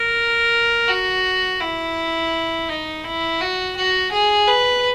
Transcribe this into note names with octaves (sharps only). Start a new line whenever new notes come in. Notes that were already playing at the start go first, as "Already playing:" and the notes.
Already playing: A#4
F#4
E4
D#4
E4
F#4
F#4
G#4
B4